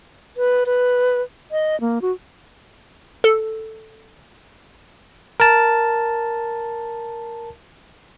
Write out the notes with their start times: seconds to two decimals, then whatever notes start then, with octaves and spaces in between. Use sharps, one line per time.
0.37 B4
0.66 B4
1.52 D#5
1.81 A#3
2.02 F#4
3.24 A4
5.40 A#4 A5